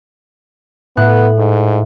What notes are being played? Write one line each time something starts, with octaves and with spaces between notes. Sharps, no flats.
A2 B3 F#6
G#2